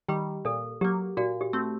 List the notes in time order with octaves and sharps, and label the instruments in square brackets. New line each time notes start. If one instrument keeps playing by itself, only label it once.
[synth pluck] D#3 G3 [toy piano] G4
[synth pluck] A#2 [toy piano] A4
[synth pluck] F#3 A#3 [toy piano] G4
[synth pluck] A#2 [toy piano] F#4
[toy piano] G4
[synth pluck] A3 C4